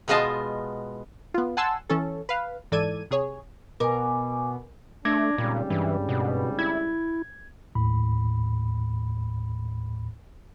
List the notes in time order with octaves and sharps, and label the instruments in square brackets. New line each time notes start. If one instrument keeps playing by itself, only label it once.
[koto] B2 G#3 B3 F4 D#5 A5
[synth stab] B3 F4
F#5 G#5 A5 C6 E6
E3 C#4 A4
B4 F5
G#2 E3 A4 D5 G#6 D#7
C3 G#4 C#5
[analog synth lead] B2 [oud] A#4 [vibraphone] G#5 D6
[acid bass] A3 [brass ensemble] D4 [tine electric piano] D6 G#6 A#6
[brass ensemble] G#1 C#3 G3 [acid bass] A#2
[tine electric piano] G2 [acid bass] E3
[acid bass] B2
[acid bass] E4 [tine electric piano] G#6
[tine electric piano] D#2 A2 B5